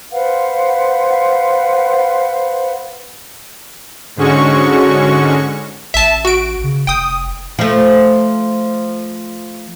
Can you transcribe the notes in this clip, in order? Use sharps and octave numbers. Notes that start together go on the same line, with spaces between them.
B4 C5 F5 F#5
G#2 D3 G#3 C#4 F#4 C#6
A1 E5 A5
F#4 D7
C#3
F1 G5 D#6
F3 A3